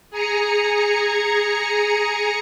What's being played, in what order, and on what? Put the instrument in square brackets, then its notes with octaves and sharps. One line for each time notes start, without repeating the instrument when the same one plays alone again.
[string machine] G#4 G#5 A#5 C#7